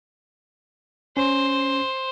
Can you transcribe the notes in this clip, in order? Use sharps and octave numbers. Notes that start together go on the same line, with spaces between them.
C#4 C5